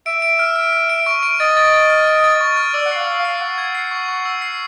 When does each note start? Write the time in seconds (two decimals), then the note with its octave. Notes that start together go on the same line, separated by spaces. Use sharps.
0.06 E5 D7
0.22 D7
0.39 F6
0.56 F6
0.73 F6
0.89 D7
1.06 C#6
1.23 D7
1.40 D#5 A6
1.57 A6
1.74 A6
1.90 F6
2.07 D7
2.24 A6
2.41 C#6
2.57 F6
2.74 D5 E6
2.86 F#5
2.91 C7
2.96 F5
3.07 E6
3.19 F5
3.25 C7
3.41 F#5 C#6
3.58 G#6
3.75 C7
3.91 C#6
4.09 C#6
4.25 E6
4.42 C7